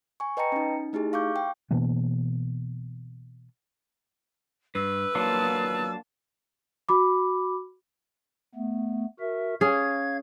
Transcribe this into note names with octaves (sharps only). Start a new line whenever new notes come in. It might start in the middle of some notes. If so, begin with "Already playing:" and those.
G#5 C#6
B4 D#5 G5 A5 A#5 C#7
C#4 D#4
A3 D#4 E4 G4 G#4
F5 C#6 D6 G6
G5
B2 E3 A#3 B3
G2 B4 E6
F#3 A#3 D4 F4 A5
F#4 B5 D6
A3 B3
F#4 A#4 E5
C#4 G#4 F5 G#6